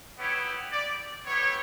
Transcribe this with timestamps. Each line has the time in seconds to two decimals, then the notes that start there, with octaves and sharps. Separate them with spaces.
0.17 B3 E4 G4 C#5
0.72 D5
1.24 B3 E4 G4 C#5